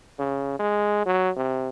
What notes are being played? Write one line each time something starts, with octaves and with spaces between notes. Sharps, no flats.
C#3
G#3
F#3
C3